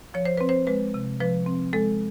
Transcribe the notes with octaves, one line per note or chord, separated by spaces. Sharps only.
F3 C#5
C5
C4 B4
C5
G#3 B4
C3
F3 B4
C4
G#3 A4